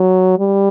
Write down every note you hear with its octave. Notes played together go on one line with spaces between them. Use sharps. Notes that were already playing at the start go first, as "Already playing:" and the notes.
Already playing: F#3
G3